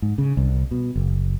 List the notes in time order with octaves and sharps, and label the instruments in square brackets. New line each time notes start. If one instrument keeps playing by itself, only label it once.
[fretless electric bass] G#2
C#3
C2
B2
F#1